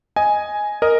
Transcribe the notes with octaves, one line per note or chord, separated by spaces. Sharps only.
D#5 G#5
A#4 D#5